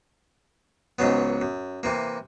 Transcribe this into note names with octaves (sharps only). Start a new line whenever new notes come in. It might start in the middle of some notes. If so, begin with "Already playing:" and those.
C#2 G#2 C#3 F#3 B3
F#2
C3 E3 A#3